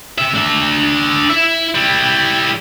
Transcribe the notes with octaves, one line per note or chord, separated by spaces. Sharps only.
C3 E5
D4 E5
E4 E5
G3 E4